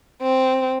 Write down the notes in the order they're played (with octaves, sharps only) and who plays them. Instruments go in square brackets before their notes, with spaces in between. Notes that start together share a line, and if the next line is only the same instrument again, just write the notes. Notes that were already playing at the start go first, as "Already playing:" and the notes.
[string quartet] C4